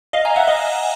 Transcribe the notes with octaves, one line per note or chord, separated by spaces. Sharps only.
D#5 F5
G#5 A#5
E5 F#5
D#5 F5